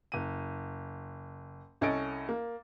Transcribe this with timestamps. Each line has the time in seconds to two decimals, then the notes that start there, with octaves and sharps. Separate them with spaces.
0.12 F#1 D#7
1.81 C2 C#4 A4 D#5 A6 D7
2.29 A#3